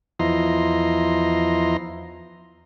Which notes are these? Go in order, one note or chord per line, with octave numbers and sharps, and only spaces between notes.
E2 F3 E4 D#5 A#5 C6